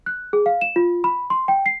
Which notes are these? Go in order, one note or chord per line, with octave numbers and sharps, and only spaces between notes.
F#6
G#4
F5
E7
F4
B5
C6
G5
C7